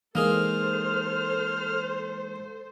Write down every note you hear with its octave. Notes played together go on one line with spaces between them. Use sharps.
E3 G#3 A#3 D#4 G#4 A4 C5 F6